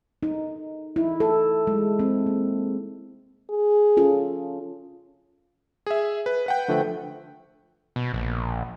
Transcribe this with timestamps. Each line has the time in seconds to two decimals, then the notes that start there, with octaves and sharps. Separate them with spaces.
0.23 D#4
0.96 E4
1.20 A4
1.67 G#3
1.99 C4
2.26 A#3
3.49 G#4
3.97 C#4 F4 A4
5.86 G#4 E5
6.26 B4
6.46 B4 F#5 G5
6.68 D3 F3 A3
7.96 B2
8.14 A#1